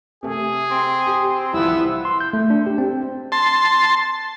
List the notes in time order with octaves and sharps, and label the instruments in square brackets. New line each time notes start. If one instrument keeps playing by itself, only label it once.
[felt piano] C3 A3 [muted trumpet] G#4
[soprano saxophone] C4
[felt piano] G4
[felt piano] C2 F3 [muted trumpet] B3 [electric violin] E4 E6
[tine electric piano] C6
G6
A3
D4
G4
C4
[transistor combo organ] A5 C6